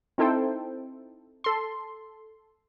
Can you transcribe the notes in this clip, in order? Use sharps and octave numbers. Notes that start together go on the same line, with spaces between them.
C4 D#4 E4 A4 C5 G5
A4 C6